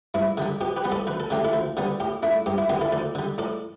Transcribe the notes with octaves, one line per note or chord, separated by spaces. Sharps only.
G2 E4
D3 G3 D4
B2 G4
G4 B4
G3 B3
A4 D5
D2 B4
A4
D3 A3 D4 G4
E4 A4
D2
D3 G3 B3
A2 G4
A3 D4 E4
G2 G4
E4
D3 B3 G4
E4 A4
D2 A4 D5
D3 G3
A2 A4 D5